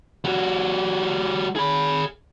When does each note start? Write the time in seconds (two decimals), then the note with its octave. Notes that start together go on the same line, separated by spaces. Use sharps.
0.24 G3 F#4
1.56 G#4 B5